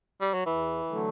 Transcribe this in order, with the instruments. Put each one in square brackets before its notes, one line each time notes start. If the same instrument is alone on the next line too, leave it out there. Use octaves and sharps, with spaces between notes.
[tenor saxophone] G3
F#3
[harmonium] E2 [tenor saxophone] E3
[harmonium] D3 F#3 A3